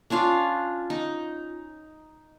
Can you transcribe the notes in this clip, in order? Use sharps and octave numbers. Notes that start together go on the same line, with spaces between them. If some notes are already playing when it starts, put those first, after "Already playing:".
C#4 D4 F4 F5
D#4